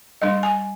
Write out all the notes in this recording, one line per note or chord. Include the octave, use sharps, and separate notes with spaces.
G3 D4 D#5
G#5